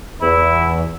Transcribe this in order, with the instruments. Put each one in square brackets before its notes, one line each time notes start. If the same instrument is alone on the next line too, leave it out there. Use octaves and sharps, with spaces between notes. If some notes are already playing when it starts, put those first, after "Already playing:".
[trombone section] E2 [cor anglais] E4